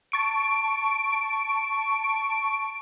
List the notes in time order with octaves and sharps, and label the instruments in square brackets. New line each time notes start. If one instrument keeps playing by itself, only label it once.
[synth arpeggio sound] A5 C#6 D7